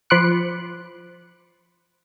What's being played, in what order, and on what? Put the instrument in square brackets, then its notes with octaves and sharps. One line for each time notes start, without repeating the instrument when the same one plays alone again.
[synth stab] F3 B5 C6 D6 F#6 C#7